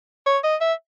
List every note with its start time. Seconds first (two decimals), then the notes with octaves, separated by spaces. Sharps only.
0.26 C#5
0.44 D#5
0.61 E5